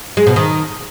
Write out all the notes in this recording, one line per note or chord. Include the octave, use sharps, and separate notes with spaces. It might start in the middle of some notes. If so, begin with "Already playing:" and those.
G#3
B2
D#3